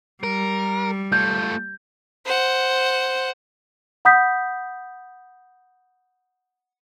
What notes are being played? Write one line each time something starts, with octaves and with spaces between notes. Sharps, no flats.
G3 A#4
A3 F4 G6
C5 F#5
F#5 B5 D#6 G6 B6